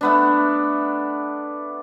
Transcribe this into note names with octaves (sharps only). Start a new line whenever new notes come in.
A3 B3 D4